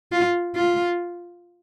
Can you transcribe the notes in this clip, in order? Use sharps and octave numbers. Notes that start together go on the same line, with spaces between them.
F4
F4